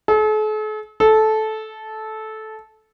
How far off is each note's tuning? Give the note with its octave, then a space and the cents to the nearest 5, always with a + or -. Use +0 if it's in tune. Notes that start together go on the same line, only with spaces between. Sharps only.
A4 -45
A4 -15